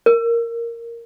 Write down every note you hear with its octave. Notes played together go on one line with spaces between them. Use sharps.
A#4